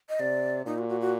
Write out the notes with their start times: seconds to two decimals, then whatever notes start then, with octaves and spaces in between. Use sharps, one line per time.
0.09 D#5
0.20 C3 D5
0.66 A#2 D#4
0.78 F#4
0.89 F#4
1.01 F#4